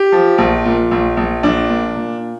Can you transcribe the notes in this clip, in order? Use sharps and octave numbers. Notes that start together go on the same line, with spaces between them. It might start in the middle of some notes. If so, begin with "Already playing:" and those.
Already playing: G4
F3
A#1
A#2
A#1
A#1
A#1 D4
A#2
A#2